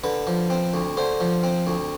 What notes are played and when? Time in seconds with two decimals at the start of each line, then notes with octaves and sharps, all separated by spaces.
0.04 D3 B4
0.27 F3
0.50 C4
0.74 D2
0.97 D3 C5
1.20 F3
1.43 C4
1.67 D2